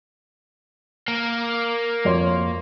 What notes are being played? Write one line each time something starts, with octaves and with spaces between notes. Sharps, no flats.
A#3
F2 C#5 C6